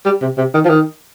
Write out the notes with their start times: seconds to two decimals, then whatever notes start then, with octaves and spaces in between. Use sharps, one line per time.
0.05 G3
0.22 C3
0.38 C3
0.54 D#3
0.65 F3
0.70 D#3